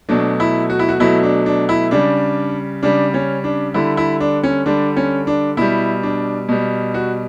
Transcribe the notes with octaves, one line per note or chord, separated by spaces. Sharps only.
B2 F#3 A3 D4
E4
F#4
E4
F#4
B2 F#3 A3 E4
D4
D4
E4
C#3 G3 D4
C#3 G3 D4
C#4
D4
D3 G3 E4
E4
D4
C#4
D3 G3 D4
C#4
D4
B2 G3 E4
D4
B2 G3
F#4